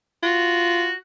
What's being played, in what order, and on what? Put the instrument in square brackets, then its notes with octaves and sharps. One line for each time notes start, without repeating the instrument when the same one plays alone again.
[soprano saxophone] F4 [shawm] F#4